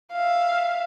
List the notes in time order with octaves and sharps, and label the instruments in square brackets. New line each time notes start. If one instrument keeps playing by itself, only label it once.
[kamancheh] E5 F5